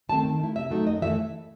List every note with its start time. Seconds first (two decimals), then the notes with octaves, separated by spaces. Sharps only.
0.09 D#3 F#3 A3 C4 A5
0.24 D#3
0.40 A3 E4
0.55 C3 E5
0.71 F#3 A3 D#4
0.87 F#2 D#5
1.02 E3 A3 E4 E5